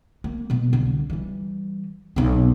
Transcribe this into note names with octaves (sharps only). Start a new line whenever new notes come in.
A#3
B2 B3
C2 D3
E3 G3
B1 C4